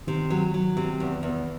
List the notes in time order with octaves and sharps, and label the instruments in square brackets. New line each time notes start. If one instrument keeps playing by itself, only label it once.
[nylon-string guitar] C3 [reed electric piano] D#3
[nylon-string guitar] F#3
F#3
C3
E2
E2